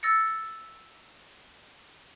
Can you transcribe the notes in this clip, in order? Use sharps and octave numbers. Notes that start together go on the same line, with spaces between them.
E6 A6 A#6 C#7